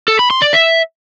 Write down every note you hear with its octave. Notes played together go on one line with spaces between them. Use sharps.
A4
B5
C6
D5
E5